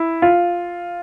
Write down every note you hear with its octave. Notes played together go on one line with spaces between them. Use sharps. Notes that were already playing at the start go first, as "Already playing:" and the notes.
Already playing: E4
F4